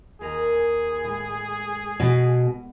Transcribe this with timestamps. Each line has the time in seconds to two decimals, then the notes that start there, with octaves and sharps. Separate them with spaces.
0.21 D#2 G#4 A#4 D#5
1.03 A2 G#3
2.00 B2